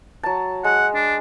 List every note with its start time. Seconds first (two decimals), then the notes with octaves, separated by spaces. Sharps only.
0.23 F#3 A5
0.64 G#3 F#5
0.95 D4